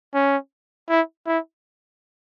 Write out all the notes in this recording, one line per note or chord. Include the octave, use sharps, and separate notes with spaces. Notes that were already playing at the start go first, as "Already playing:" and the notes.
C#4
E4
E4